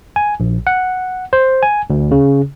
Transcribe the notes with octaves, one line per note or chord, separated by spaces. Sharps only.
G#5
A#1
F#5
C5
G#5
D2
C#3